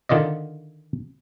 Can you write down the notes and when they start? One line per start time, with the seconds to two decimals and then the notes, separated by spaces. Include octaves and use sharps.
0.09 D3 D#3 F4 D5 D#5